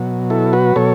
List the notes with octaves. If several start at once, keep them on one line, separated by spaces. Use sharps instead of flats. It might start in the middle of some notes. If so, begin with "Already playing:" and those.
Already playing: B2 F#3
E4 A4
F#4 B4
B2 F#3 A4 C#5